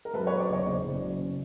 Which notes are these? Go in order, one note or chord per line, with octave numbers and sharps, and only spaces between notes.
A#4
F#2 A4 B4
B4 C#5
F#2
C5 D5
F#1 C#5 D#5
F#1 C5 D5
F#1
F#2
C#3